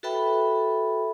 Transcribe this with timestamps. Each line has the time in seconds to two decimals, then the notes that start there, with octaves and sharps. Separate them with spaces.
0.03 F#4 A4 B4 E5 G5 B5